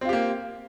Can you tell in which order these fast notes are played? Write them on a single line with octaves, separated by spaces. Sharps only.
C4 F4 G4 A#3